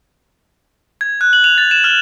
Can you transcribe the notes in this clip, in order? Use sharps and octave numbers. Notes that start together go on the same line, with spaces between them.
G#6
F#6
F#7
F7
A6
E7
F6